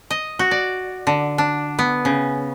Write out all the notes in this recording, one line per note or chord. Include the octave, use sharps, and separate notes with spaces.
D#5
F#4
D5
D3
D4
B3
C#3